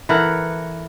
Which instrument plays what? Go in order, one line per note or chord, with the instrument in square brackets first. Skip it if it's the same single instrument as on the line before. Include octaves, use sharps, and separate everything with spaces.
[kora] E3 A4 A#4 F#5